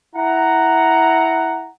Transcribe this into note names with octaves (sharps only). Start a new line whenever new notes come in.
E4 F#5 A#5